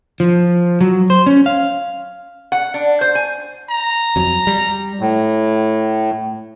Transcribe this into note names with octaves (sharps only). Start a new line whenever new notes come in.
F3
F#3
C5
C#4
F5
F#5
D4
C5
G#5
A#5
F2 F#3
G3
A2